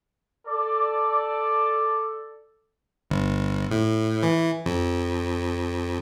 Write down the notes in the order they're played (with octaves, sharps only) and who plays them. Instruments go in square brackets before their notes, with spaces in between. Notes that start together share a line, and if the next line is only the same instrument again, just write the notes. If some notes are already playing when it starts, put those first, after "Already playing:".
[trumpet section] A4 D5
[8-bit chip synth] G1
A2
E3
F2